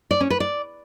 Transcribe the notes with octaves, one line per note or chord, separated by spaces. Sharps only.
D5
C#4
B4
D5